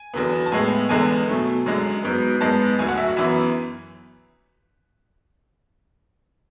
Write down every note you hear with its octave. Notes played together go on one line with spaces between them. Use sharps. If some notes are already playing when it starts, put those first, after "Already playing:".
Already playing: G#5
E2 D3 F#3 B3
A5
A2 G#3 B3 G#5
E2 D3 G#3 B3 G#5
B2 F#3 A3
F#2 D3 G#3
G#2 F#3 B3
G#2 G#3 B3 A5
D2 D3 F#3 G#5
F#5
E5
F#4
F#2 E3 B3 E5